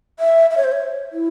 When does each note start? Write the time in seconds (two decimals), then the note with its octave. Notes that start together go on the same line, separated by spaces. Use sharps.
0.19 E5
0.51 E5
0.57 C#5
0.64 C5
0.72 C#5
1.13 E4